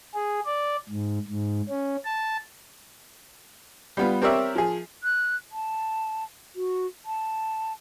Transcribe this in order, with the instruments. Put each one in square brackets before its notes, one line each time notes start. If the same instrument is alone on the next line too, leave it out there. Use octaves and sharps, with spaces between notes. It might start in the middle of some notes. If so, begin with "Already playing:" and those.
[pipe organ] G#4
D5
G#2
G#2
C#4
A5
[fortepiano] G3 B3 F4
C4 G4 A#4 C#5 D5 E5
F3 G#4
[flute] F#6
A5
F#4
A5